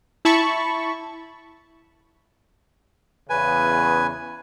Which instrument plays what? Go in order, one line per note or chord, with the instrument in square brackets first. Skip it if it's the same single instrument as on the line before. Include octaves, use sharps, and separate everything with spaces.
[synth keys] E4 A5 B5 C#6
[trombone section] E2 C#3 [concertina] B4 G#5